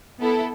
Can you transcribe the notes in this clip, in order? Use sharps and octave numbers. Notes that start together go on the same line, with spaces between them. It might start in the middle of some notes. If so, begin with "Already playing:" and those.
B3 E4 A4